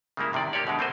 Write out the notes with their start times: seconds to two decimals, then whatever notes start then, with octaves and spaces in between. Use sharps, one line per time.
0.17 C#3 G3 G#3 A#3 E4
0.33 A2 C3 D#3 D5
0.53 A#3 G4 C#5 D5
0.66 F#2 B2 D3 G#3
0.79 A3 A#3 C4 G#4 B4 C5